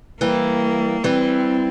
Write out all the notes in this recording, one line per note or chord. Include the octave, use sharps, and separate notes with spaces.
E3 G3 A#3
E3 G3 C4